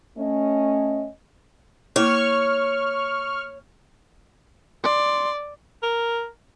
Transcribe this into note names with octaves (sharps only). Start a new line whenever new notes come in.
A3 C#4 D#5
A#3 E4 C#5 C#6 F6
D5 C6
A#4